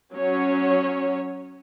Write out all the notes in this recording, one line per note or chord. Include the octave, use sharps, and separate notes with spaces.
F#3 C#4 C#5